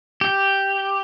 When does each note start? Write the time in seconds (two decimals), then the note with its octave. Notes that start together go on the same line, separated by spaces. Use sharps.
0.21 G4